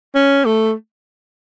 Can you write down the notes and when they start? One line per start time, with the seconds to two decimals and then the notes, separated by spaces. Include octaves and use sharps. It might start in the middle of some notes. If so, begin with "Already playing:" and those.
0.15 C#4
0.45 A3